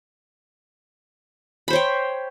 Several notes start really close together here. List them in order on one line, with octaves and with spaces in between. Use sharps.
B5 C5 C#5 G5